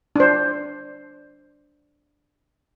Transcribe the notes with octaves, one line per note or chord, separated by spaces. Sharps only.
D4 C5